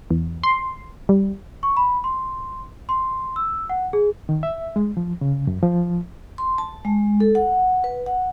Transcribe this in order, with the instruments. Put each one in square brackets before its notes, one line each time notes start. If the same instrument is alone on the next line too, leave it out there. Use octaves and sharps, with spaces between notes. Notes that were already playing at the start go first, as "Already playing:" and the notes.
[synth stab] E2
C6
G3
[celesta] C#6
B5
C6
C6
E6
F#5
G#4
[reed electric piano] D#3
E5
G#3
F3
C#3
F#2
F3
[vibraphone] C6
A5
G#3
A4
F#5
B4
F#5